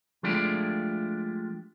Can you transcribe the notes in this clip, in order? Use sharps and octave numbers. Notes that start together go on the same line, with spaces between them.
F3 G#3 A3 D4 F4 G4